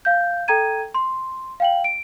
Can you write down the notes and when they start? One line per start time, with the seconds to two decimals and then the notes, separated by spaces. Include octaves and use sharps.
0.05 F5 G6
0.48 A4 G5 A#5 G#6 D#7
0.94 C6
1.60 F5 G5 F#7
1.84 D7